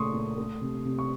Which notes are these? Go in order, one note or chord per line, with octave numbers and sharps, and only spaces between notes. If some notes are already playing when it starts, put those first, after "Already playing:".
Already playing: A#2 C#3 A3 C6 C#6 D#6
A#2
A3
C3
C3
C#6